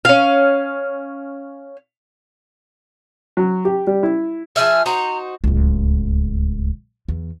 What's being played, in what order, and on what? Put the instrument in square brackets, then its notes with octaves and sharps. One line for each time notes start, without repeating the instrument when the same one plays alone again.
[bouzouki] C#4 F5
[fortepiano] F#3
G4
G3
E4
[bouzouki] F3 G#4 E5 [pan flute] F6
[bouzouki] D#4 F#4 C5 [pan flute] A#5
[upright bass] D1 C#2
E2